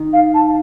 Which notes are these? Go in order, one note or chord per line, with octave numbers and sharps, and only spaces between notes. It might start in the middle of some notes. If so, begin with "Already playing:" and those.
Already playing: D#3 D#4
F5
A5